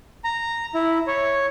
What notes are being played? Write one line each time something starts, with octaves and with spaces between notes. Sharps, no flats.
A#5
E4
C#5